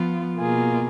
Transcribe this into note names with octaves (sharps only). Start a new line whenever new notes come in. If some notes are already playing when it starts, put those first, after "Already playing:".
Already playing: F3 B3 F4
B2 A#3 F4 G#4